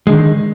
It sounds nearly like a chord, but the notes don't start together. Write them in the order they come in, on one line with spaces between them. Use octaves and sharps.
G#3 D3 D#3